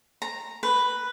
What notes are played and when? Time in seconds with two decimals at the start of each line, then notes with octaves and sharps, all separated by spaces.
0.22 A#5
0.63 B4